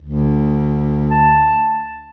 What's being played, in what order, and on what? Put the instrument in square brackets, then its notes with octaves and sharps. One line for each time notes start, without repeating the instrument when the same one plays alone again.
[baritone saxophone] D2
[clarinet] A5